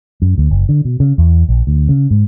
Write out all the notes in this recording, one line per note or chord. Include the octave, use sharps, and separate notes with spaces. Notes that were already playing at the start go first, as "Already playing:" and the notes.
F#2
D2
F#1
D3
B2
C#3
E2
A#1
D2
C#3
G#2